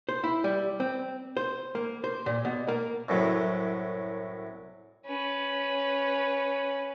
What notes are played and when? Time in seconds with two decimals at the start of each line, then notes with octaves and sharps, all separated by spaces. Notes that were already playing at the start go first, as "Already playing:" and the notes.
0.09 C5
0.24 E4
0.44 G3
0.80 C4
1.37 C5
1.75 A#3
2.04 C5
2.26 A#2
2.45 B2
2.68 A#3
3.08 C2 F#2 A2 F#3
5.06 C#4 B4